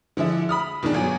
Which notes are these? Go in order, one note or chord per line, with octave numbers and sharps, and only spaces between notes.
D3 F3 G#3 E4
B5 D#6 F6
B2 D#3 G#3 D4
G1 F#3 G#5